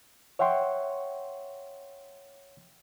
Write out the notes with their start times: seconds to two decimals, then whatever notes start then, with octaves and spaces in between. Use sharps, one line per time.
0.39 C#5 E5 F#5 G5 C6 C#6